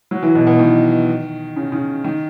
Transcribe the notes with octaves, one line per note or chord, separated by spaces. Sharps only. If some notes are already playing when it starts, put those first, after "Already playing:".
F#3
E3
B2
B2
D#3
C#3
C#3
D#3